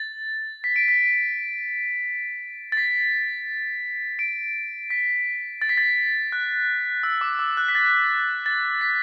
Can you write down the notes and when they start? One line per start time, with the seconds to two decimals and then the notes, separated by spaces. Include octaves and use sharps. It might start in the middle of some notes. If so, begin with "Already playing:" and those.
Already playing: A6
0.64 B6
0.76 D7
0.88 B6
2.72 A6
2.77 B6
4.19 D7
4.90 B6
5.62 A6
5.69 B6
5.77 A6
6.32 F#6
7.03 E6
7.21 D6
7.39 E6
7.57 F#6
7.68 B6
7.75 A6
8.46 A6
8.81 B6